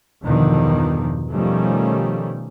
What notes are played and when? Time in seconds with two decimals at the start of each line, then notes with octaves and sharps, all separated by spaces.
0.24 E2 G2 B2 D3 D#3 F3
1.31 B2 D#3 F3 G3 A3 C#4